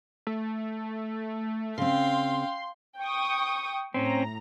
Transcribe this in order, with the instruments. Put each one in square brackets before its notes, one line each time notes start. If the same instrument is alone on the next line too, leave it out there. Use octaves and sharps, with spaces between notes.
[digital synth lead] A3
[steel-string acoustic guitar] C#3 C4 [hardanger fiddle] F5 G5 [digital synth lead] C6
[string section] G5 C#6 D#6
[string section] A2 A#5 [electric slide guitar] C4 C#4